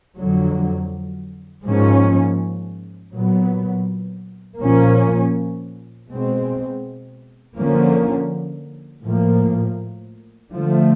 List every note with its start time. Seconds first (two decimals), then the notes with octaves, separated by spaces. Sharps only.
0.16 F2 D3 F#3
1.64 G#2 F3 A#3 C#4
3.12 A#2 F#3 B3
4.60 A#2 F3 A#3 C#4
6.08 B2 G#3 C4
7.56 D3 F3 A#3 C#4
9.04 A2 F3 A#3
10.52 D3 F3 A3